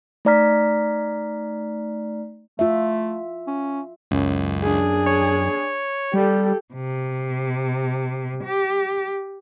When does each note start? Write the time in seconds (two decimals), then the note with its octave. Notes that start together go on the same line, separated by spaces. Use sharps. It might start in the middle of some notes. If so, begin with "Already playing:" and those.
0.25 A3 D#4 D5 A#5 F6 B6
2.59 A3 F4 E5
3.47 C#4
4.11 C#2 F#2
4.63 D4 G#4
5.06 C#5
6.14 G3 G4 A4
6.74 C3
8.44 G4